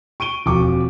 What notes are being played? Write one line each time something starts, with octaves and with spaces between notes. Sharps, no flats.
C#6 D7 D#7 G7
E1 F2 F3 C#6 D6